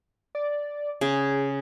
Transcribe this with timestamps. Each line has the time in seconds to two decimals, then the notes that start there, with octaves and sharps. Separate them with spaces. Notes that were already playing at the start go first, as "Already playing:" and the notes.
0.35 D5
1.01 C#3 G#4